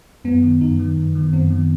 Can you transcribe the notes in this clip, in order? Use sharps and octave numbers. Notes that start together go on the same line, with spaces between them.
F#2 B3
D#3
F#2 D#4
D#3
F#2
D#3
F#2 C4
D#3